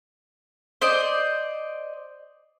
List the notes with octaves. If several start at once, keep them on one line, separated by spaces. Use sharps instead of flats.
C5 D5 D#5